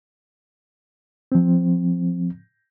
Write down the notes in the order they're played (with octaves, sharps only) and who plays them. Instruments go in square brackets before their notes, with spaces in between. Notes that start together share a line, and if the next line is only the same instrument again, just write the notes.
[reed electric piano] F3 C4